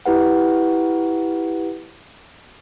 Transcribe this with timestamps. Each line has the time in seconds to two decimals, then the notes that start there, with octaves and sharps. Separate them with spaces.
0.06 E4 G4 B4 F#5